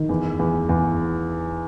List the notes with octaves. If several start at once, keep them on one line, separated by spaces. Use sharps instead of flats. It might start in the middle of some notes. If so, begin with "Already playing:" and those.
Already playing: D#3
E2
E2
E2